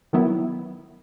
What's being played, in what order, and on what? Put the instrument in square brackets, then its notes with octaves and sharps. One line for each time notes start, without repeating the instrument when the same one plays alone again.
[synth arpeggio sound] D#3 F#3 B3 E4